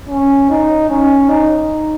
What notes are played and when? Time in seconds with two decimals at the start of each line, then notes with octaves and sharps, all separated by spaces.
0.09 C#4
0.50 D#4
0.90 C#4
1.29 D#4